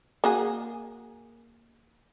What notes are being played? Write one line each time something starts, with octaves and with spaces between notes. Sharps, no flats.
A#3 F#4 G#4